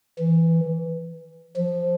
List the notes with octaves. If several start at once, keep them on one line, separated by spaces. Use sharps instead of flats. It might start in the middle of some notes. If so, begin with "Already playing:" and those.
E3
F3